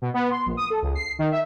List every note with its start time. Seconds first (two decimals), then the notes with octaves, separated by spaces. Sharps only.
0.02 B2
0.14 B3
0.31 C6
0.46 A#1
0.57 D#6
0.70 A4
0.82 C#2
0.95 C7
1.19 D#3
1.31 E5